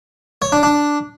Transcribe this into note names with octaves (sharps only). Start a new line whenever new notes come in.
C#5
D4
D4